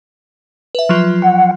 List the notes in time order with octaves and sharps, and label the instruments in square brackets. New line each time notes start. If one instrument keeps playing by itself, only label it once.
[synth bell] B4 E5
F3 F#3 F4
[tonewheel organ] F#5